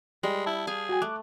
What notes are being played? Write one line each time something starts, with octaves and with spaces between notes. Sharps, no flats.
G3 G#3
E4 A5
G#4 F5
F#4 G5 G#5
A3 D6 F#6